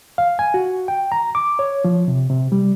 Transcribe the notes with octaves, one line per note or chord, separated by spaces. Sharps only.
F5
G#5
F#4
G5
A#5
D6
C#5
F3
C3
C3
G3